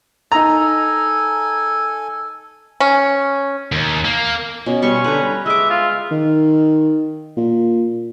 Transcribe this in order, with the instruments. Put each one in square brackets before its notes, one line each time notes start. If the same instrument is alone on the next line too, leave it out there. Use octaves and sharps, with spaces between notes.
[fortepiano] D#4 A#5 [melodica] A4 G#5
[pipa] C#4
[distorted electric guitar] D#2
A#3
[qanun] B2 [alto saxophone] C#4
[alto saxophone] G3 [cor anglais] C#4 [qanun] C6 C#6
[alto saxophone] D3 [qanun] B4 A#5
[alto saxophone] G3
[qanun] G#3 D6 [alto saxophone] D#5 [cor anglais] E5
[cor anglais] F4
[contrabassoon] D#3
A#2